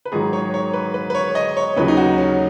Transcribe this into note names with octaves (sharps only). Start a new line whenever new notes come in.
B4
G#2 D#3 F#3 G#4
C#5
C#5
B4
B4
B4
C#5
D#5
C#5
D#2 C#3 F#3 B4
D#4
F#4
C#4